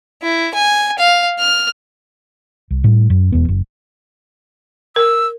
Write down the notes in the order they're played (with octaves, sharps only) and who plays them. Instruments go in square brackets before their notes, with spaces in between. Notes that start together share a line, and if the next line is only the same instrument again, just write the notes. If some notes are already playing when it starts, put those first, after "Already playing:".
[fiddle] E4
G#5
F5
F6
[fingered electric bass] C2
A2 G3 A3
F#2
E1 E2 B3
F#1
[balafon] A#4 [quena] E6